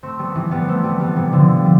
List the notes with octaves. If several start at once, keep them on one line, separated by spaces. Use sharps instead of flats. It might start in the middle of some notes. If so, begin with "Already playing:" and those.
A3 C4
G3 B3
E3 G3
G3 B3
A3 C4
G3 B3
G3 B3
C3 E3
D3 F3
G3